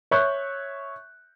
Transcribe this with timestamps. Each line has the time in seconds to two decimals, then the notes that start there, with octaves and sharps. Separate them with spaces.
0.11 C#5 E5 C#6 F#6 G6